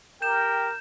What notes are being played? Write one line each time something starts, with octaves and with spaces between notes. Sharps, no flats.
G4 A#4 G5 G6 E7